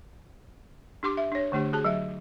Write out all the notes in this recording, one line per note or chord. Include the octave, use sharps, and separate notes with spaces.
D4 G4 C6 D6
E5
D4 C#5
D3 A3 D4 G4
F#4 G#4 A5
F#3 E5